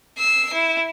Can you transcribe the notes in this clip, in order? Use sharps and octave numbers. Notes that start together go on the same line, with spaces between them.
E6 C7
E4